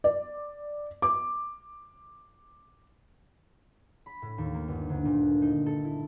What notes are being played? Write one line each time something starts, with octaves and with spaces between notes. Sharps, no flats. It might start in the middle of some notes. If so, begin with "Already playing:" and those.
D5
D6
B5
A2
D#2
A#3
G1
D2
A#2
D#4
A4
E4